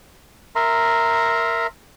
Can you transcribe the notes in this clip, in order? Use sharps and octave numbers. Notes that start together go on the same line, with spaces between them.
A#4 E5 A#5 C6